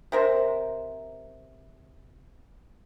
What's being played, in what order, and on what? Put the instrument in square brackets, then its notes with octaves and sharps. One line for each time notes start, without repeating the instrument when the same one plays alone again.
[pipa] C3 A#4 C5